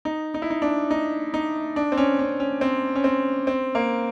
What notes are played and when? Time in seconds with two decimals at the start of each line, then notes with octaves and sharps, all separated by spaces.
0.05 D#4
0.34 D#4
0.42 E4
0.50 D#4
0.62 D4
0.91 D#4
1.34 D#4
1.76 D4
1.92 C4
1.97 C#4
2.19 C#4
2.40 C#4
2.61 C4
2.95 C#4
3.04 C4
3.47 C4
3.75 A#3